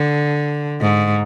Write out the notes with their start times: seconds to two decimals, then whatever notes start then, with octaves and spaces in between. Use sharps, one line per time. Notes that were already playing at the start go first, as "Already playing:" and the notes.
Already playing: D3
0.81 G#2